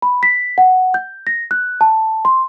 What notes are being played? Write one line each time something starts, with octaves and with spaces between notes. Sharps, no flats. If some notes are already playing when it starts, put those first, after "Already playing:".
B5
B6
F#5
G6
A#6
F#6
A5
C6